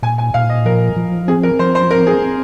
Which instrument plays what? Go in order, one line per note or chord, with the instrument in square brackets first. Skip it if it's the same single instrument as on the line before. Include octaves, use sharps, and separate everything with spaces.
[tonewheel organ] A#2 [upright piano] G#5
[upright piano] G#5
[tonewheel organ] A#2 [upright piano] F5
[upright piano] D#5
[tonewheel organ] F3 [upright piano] A#4
[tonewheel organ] F3
[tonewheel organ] C4 [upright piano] G#4
[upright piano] A#4
[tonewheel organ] F3 [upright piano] C5
[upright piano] C5
[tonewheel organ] C4 [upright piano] A#4
[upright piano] G#4
[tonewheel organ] C4